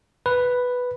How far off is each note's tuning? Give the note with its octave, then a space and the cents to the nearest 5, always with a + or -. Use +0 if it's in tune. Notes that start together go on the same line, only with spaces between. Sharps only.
B4 +0